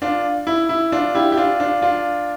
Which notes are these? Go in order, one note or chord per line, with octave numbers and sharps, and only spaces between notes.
D4 F4
E4
E4
D4 F4
E4 G4
G4
D4 F4
D4 F4
D4 F4